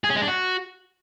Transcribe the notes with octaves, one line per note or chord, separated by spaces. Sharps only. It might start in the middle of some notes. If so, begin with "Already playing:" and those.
G#4
C#4
G#3
D4
F#4